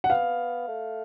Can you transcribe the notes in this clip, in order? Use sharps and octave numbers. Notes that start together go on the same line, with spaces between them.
F#5
B3 F5
A3